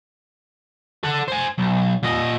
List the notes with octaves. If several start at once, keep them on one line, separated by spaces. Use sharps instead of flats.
A4 F#5
C5 G#5
B1
A#2 D#5